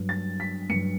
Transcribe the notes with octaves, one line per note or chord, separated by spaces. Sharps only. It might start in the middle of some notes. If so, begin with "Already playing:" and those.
Already playing: G2 F#3
A6
B6
G2 F#3 C#7